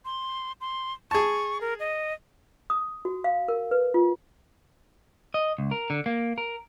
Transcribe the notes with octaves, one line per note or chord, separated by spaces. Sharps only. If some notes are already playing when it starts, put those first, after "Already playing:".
C6
C6
G#4 A5 C#6
A#4
D#5
D#6
F#4
F5
A#4
B4
F4
D#5
C#2
A#4
D3
A#3
A#4